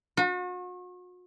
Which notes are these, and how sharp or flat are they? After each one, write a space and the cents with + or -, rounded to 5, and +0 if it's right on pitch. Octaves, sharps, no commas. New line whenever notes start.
F#4 -40